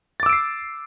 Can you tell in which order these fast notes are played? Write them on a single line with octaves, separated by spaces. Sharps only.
A6 D6 E6 D7 C7